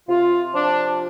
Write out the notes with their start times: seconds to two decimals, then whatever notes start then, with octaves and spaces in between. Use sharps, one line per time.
0.08 C3 F4
0.54 F3 D4